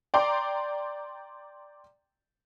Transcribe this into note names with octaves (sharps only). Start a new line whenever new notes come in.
D5 G5 A#5 C6 D6